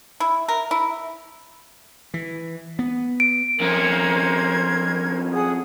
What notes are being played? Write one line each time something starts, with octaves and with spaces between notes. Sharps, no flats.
E4
A#4
E4
E3
B3
D7
F2 C#4 A#4 C5 G#6
G#4 F#5 D#6